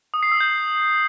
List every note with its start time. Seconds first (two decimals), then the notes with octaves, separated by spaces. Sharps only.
0.14 D#6
0.23 C7
0.32 E6
0.41 G6